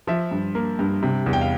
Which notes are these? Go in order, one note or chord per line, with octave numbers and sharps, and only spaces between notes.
F3 E5
G2
A#3
G2
C3
E2
G5
F5